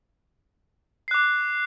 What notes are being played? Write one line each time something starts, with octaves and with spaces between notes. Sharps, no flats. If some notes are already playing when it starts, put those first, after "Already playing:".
D6 F#6 C7